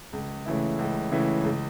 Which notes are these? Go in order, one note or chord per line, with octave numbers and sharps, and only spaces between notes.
C#2
C#3 E3 A3 E4
C#2
C#3 E3 A3 E4
C#2